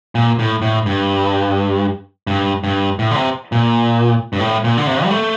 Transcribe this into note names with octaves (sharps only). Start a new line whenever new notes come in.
A#2
A2
A2
G2
G2
G2
A2
D3
C3
A#2
G2
A2
A#2
D3
C3
G3
A3